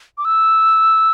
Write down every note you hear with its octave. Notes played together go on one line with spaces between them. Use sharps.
D6
E6